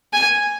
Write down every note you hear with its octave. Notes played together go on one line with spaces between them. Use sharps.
G#5